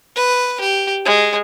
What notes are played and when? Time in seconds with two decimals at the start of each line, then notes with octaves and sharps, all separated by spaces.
0.16 B4
0.60 G4
1.05 G#3